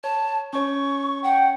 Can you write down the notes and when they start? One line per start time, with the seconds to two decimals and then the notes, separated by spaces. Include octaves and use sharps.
0.04 C#5 A5
0.53 C#4 C#5 C#6
1.24 F#5 G5